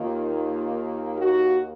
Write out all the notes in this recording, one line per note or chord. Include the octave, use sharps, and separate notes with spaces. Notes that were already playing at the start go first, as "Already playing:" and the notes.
Already playing: D#2 D#3 A#3 F4
F#4